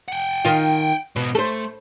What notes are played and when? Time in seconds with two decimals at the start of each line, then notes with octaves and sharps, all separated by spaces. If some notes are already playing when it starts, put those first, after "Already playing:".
0.08 F#5 G5
0.45 D#3 F4
1.16 G#2 B2 B3
1.35 A3 A4 C5